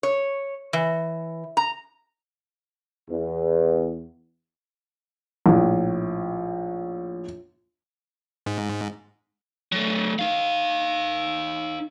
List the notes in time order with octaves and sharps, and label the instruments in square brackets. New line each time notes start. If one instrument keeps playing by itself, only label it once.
[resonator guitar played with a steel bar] C#5
E3
A#5
[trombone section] E2
[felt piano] A#1 A2
[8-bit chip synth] G#2
[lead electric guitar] F#3 A3
D#4 F5